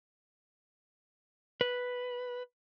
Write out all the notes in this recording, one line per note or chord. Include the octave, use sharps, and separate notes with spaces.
B4